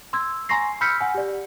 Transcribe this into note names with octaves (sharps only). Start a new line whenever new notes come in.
C6 E6 G#6
G#5 A#5 C6 C#6 A#6 C7
B5 E6 F6 G6 B6 C#7
F#5 G#5
G4 D5